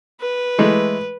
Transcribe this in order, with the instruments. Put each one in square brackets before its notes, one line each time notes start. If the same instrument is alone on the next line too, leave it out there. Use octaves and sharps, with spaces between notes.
[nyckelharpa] B4
[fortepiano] E3 G#3 A3